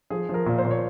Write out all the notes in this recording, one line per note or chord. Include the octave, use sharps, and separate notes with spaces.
F3 G#4
F3 A#4
A#2
C5
A#2
C#5